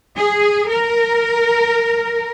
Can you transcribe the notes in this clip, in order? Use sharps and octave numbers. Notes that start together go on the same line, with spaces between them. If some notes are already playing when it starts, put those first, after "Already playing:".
G#4
A#4